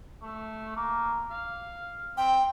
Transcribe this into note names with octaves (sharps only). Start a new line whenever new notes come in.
A3
A#3
F5
C4 G5